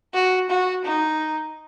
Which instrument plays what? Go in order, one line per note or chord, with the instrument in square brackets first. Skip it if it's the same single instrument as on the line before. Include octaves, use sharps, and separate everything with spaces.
[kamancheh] F#4
F#4
D#4